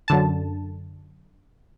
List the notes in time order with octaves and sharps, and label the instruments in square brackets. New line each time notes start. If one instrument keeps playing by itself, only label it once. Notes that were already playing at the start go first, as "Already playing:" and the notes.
[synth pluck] F#2 D3 A5